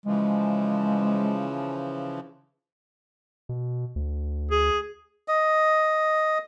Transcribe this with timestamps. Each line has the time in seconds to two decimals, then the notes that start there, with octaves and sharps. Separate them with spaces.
0.06 C#3 E3 F3 G#3
3.49 B2
3.96 D2
4.51 G#4
5.28 D#5